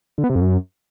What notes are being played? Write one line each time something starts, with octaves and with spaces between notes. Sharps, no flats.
D3
B3
C3
F2
F#2